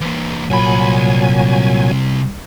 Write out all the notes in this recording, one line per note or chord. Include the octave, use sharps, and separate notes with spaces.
E3 A#3
C2 A#2 F#3 G#5 B5